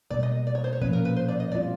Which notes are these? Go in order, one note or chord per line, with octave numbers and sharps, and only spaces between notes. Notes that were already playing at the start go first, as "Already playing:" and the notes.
B2 G3 A#3 D5
D#5
D5
C#5
C5
C#5
A#2 F3 A#3 C#4 B4
A#4
B4
C5
D5
D#5
G3 C4 F4 D5